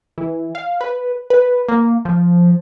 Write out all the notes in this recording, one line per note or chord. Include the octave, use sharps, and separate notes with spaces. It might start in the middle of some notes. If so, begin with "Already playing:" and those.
E3
F5
B4
B4
A#3
F3